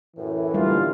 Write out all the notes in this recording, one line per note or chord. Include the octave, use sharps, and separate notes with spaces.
F#2 A2 E3
D2 G3 A#3 F4